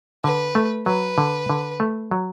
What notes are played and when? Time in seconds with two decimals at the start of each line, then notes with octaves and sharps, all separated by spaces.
0.24 D3 B4
0.55 A3
0.86 F#3 B4
1.18 D3
1.49 D3
1.80 A3
2.11 F#3